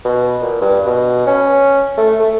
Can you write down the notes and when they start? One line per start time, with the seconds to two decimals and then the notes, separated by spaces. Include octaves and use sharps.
0.05 B2
0.42 A#2
0.61 G2
0.86 B2
1.27 C#4
1.98 A3
2.20 A3